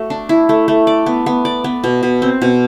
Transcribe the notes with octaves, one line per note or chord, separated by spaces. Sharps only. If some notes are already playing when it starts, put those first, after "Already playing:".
Already playing: A3 F#4
D4
E4
A3
A3
D5
B3
B3
D5
B3
B2
B2
C4
B2